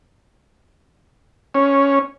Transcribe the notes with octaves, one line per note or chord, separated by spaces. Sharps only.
C#4